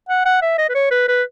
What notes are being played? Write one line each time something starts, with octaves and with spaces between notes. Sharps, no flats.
F#5
F#5
E5
D#5
B4
C#5
B4
B4